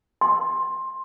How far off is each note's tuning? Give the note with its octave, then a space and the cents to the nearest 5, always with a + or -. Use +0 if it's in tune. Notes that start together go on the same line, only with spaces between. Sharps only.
C6 +15